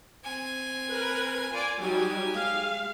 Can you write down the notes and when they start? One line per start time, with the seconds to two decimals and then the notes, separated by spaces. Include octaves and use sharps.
0.24 C4 G#5
0.89 A#4 B4
1.51 F4 D5 G#5
1.81 F#3 G3 D#4 G4 G#5
2.32 G#3 F5